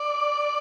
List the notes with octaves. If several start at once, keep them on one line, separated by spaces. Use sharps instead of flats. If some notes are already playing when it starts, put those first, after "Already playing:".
Already playing: D5